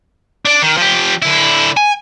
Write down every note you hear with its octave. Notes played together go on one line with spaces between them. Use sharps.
D4 D5
D#3
F3 G4
D3 E4
G#5